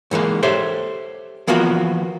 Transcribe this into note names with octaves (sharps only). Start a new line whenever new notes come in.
G#2 E3 G#3 A#3
G4 A4 C5 C#5 E5
E3 F3 A#3 B3 F4 F#4